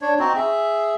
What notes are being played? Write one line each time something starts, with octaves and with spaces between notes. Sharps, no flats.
D4 C#5
C4 D#4 F#4
G#4 E5